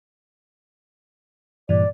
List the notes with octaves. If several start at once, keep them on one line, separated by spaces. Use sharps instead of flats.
G2 A#2 E3 D5